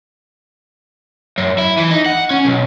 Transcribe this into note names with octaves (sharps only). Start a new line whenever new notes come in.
F#2
E4
E3
D#4
F#5
C#4
B1